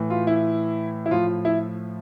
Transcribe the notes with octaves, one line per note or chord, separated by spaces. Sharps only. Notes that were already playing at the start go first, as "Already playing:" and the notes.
Already playing: A2 E3
F4
E4
E4
A2 F3 F4
E4